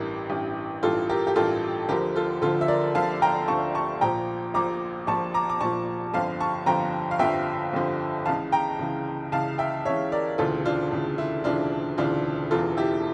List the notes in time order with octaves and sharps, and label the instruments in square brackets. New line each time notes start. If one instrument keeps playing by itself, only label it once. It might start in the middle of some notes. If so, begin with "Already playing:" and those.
Already playing: [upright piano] A1 G2 E3 G4 A#4
A1 G2 E3
A1 G2 E3 F4 A4
G4 A#4
G4
A1 G2 E3 F4 A4
D2 D3 F3 G4 A#4
F4 A4
D2 D3 F3 F4 A4
E5
A#4 D5
D2 D3 F3 F5 A5
G5 A#5
D2 D3 F3 A5 C#6
A5 C#6
A#1 A#2 F3 G5 A#5
A#1 A#2 F3 A#5 D6
A#1 A#2 F3 A5 C#6
A#5 D6
D6
A#1 A#2 F3 A5 C#6
G1 F2 D3 F3 F5 A5
A5 C#6
G1 F2 D3 F3 G5 A#5
F5
G1 F2 D3 F3 E5 G5
G1 F2 D3 F3
C#2 C#3 E3 F5 A5
G5 A#5
C#2 C#3 E3
C#2 C#3 E3 F5 A5
E5 G5
C#2 C#3 E3 C#5 E5
A#4 D5
E1 D2 C#3 E3 F4 A4
D4 F4
E1 D2 C#3 E3
E4
E1 D2 C#3 E3 D4 F4
E1 D2 C#3 E3 D4 F4
E1 E2 C#3 E3 F4 A4
E4 G4